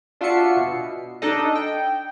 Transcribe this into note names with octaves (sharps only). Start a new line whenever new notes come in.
D4 F4 F#4 E5 C7 C#7
B2
D4 D#4 A4 D#5
G5